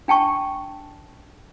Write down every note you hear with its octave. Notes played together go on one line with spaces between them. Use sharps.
D4 G5 A5 C#6